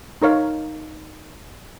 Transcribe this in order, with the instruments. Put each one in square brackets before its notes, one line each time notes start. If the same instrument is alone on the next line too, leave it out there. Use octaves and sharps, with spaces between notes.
[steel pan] D#4 A#4 C#5 F5